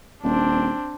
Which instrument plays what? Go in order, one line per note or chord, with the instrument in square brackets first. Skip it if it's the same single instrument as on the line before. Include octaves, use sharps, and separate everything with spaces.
[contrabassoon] D#1 [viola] C4 D4